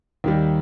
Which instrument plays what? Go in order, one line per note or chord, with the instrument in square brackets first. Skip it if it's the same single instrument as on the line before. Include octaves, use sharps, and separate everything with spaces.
[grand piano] D#2 D#3 G3